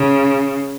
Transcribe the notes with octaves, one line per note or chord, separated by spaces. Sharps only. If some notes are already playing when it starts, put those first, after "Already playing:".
Already playing: C#3